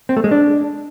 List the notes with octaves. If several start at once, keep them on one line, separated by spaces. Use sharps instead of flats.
C4
A3
G#3
D4